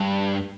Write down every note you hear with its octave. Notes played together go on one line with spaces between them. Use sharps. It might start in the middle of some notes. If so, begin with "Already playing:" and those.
Already playing: G2